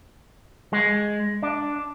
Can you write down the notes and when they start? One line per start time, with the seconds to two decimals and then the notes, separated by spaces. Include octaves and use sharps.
0.73 G#3
1.43 D4